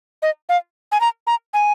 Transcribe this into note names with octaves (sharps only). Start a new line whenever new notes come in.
D#5
F5
G#5
A#5
A#5
G#5